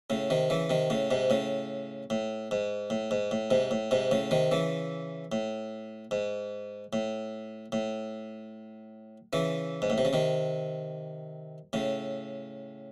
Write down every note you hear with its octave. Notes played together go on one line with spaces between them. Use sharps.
A2 C#3
C3 D#3
C#3 E3
C3 D#3
A2 C#3
G#2 C3
A2 C#3
A2
G#2
A2
G#2
A2
G#2 C3
A2
G#2 C3
A2 C#3
C3 D#3
C#3 E3
A2
G#2
A2
A2
C#3 E3
G#2
A2
C3
C#3
C3 D#3
A2 C#3